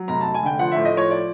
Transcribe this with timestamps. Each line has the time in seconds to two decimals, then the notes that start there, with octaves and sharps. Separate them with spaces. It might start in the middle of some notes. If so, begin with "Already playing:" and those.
Already playing: F#3
0.08 F1 A#5
0.21 A5
0.26 F1
0.34 G#5
0.43 D3 G5
0.59 F3 F#5
0.71 A2 E5
0.85 D#5
0.94 F3 C#5
1.11 D5